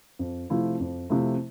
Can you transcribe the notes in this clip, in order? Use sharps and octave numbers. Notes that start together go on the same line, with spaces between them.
F2
C3 F3 A3 E4
F2
C3 F3 A3 E4